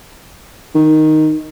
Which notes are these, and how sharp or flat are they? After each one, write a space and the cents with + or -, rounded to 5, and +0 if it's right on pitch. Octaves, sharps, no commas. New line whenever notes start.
D#3 +0